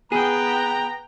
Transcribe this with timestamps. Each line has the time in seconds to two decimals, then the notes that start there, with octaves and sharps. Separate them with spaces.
0.12 B3 G#4 G5 A#5